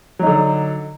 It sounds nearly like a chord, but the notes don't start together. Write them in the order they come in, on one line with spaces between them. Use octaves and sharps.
F#3 D#4 D3